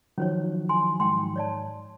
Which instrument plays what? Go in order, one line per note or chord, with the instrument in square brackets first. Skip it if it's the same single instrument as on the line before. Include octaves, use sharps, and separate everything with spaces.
[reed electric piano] D#3 F3 F#3 [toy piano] C#4 C5 C#5
[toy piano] G#5 C6
[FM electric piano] G#2 [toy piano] G5 C6
[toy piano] C#5 D5 A5